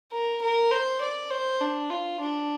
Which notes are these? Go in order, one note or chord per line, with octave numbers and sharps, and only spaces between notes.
A#4
A#4
C5
D5
C5
D4
F4
D4